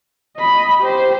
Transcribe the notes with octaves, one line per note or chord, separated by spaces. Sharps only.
D#5 B5
G4 C5